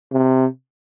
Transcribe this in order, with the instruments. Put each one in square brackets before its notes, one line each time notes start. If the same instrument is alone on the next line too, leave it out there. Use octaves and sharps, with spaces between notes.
[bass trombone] C3